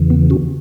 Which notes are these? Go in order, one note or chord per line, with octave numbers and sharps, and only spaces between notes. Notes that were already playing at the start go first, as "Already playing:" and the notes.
Already playing: E2 C#3 E3
B3
C#4 F#4